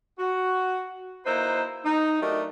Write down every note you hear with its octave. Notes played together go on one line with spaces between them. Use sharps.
F#4
A#3 D#4 E4 B4 C5
D#4
F#3 A3 D4 G4 A#4 D#5